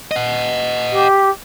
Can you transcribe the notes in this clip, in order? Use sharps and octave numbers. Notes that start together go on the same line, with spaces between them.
D#5 F#5
G4